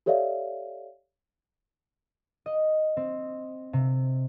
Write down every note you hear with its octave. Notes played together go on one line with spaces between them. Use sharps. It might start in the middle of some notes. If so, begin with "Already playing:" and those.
G4 A4 C#5 D5 E5 F5
D#5
C4
C3